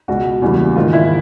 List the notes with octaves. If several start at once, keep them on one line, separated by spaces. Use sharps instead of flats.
C#2 B2 G#3 F#4
E2 C#3 E3 G3 A#3
G#2 D#3 G#3 F4
E4